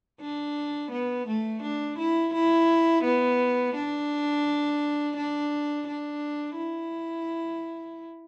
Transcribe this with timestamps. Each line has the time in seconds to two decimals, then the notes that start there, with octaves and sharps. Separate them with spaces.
0.21 D4
0.91 B3
1.28 A3
1.62 D4
1.98 E4
2.33 E4
3.03 B3
3.75 D4
5.16 D4
5.87 D4
6.57 E4